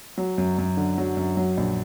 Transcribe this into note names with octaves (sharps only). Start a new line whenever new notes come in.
F#3
F#2
F#2
D3
F#3
F#2
F#3
A#1